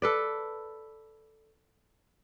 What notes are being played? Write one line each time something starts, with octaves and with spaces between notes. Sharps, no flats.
A4 B4 D5